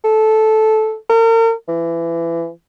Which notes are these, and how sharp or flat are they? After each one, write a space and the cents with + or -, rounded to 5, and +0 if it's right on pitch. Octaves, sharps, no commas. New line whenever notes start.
A4 -10
A#4 -40
E3 +25